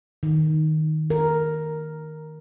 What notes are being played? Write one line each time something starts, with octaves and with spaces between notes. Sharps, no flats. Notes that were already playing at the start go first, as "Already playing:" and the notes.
D#3
A#4